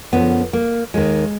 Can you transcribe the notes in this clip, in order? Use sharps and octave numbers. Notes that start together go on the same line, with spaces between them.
F#2 D3 F3 B3
A#3
D#2 D#3 G#3